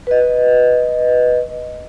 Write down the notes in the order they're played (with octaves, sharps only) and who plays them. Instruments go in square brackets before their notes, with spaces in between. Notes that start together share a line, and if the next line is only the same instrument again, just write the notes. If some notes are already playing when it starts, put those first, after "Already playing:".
[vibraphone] B4 D#5